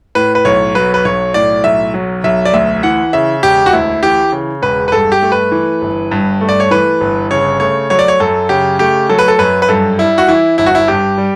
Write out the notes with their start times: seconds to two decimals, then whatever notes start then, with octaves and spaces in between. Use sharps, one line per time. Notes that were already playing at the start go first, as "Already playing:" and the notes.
0.15 A2 B4
0.35 B4
0.45 B1 C#5
0.75 F#3 B4
0.94 B4
1.05 B1 C#5
1.34 A2 D5
1.64 B1 E5
1.94 F#3
2.24 B1 E5
2.45 D5
2.53 D2 E5
2.83 E3 F#5
3.13 C#3 E5
3.43 E1 G4
3.66 F#4
3.73 D2 E4
4.03 E3 G4
4.32 C#3
4.62 E1 B4
4.88 B4
4.92 G2 A4
5.12 G4
5.22 A3
5.32 B4
5.52 E3
5.82 G1
6.11 G2
6.41 A3
6.49 D5
6.60 C#5
6.71 E3 B4
7.01 G1
7.30 C#3 C#5
7.60 A3 C#5
7.90 F#3 C#5
7.99 D5
8.08 C#5
8.20 F#2 A4
8.49 C#3 G4
8.79 A3 G4
9.09 F#3 A4
9.19 B4
9.28 A4
9.39 F#2 B4
9.62 B4
9.69 G2 A4
9.98 G3 E4
10.18 F#4
10.28 E3 E4
10.58 G1 E4
10.66 F#4
10.75 E4
10.88 G2 G4
11.18 G3